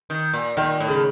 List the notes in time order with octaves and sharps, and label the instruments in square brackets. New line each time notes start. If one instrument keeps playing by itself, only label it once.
[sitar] D#3
A#2
[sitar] A#2 [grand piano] D#3
[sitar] A2
[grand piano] C#3